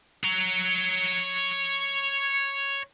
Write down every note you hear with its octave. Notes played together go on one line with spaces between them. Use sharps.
C#5 A#5